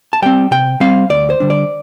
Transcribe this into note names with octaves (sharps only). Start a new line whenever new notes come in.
A5
G3 C4 G5
C3 G5
G3 C4 F5
D2 D5
C5
D3 G3 D4
D5